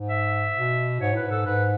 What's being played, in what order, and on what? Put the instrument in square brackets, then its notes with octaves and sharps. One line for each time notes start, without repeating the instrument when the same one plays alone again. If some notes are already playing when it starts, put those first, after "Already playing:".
Already playing: [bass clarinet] G#2
[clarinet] E5
[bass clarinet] B2
[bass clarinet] G#2 [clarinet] C#5
[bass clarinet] A2 [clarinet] B4
[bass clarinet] G#2 [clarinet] A4
[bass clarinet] G#2 [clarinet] B4